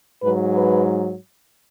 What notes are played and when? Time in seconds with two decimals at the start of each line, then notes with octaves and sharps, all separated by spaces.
0.22 G#2 F#3 B4
0.55 B4